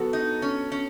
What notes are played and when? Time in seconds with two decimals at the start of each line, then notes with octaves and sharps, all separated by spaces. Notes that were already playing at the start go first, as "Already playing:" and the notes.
Already playing: F#3 B3 F#4 A4
0.13 D#4
0.42 C#4
0.72 C#4